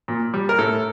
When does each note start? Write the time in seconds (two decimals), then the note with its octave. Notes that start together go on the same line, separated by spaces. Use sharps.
0.08 A#2
0.34 G3
0.49 A#4
0.59 A2 A4